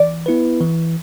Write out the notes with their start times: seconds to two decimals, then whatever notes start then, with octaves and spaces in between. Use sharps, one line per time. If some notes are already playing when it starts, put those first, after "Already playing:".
Already playing: E3 D5
0.26 B3 E4 B4
0.60 E3